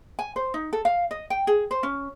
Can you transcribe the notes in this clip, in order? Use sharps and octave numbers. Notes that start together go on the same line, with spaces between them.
G#5
C5
D#4
A4
F5
D#5
G5
G#4
C5
C#4